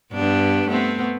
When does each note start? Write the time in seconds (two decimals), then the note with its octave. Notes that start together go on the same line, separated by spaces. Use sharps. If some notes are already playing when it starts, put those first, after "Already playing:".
0.12 G2 B3 D4
0.68 A3 B3 C4